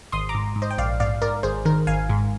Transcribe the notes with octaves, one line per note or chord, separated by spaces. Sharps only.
G#1 C6 D#6
A#5 D6
G#2
G#2
C5 D#5
G5
A#1 D5 F5
G#2 D5 F5
G#2 A#4 D5
G#1 G#4 C5
D#3 A#4
G#1 F5 G#5
G#2